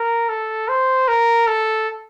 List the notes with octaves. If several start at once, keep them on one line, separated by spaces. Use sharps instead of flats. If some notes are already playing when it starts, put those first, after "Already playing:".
Already playing: A#4
A4
C5
A#4
A4